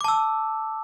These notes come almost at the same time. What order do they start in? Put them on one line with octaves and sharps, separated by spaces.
D6 A5 E6